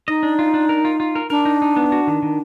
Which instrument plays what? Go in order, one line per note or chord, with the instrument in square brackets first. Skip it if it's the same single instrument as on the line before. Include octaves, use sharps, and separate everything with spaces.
[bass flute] D#4 [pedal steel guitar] D#5
[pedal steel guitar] D4
F4
D4
A#4
F4
F4
A#4
[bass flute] D4 [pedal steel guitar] A#4
[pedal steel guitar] D#4
D#4
B3
F#4
D#3
D#3